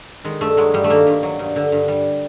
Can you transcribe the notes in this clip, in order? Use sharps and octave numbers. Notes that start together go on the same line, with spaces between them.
D#3 G#3
G2 A3
F#3 G#3
G2 G3
A3
D#3 A#3
G2
F#3
G2
D3
G2
G3